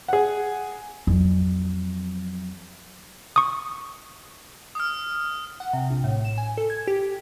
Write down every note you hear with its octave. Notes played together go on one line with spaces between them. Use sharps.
G#4 F#5
F2 F#3
C#6 D#6
D#6 F6
F#5
C3
A#1
A2
E7
G#5
A4
G#6
G4